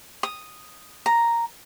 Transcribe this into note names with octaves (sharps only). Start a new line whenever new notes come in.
D#6
A#5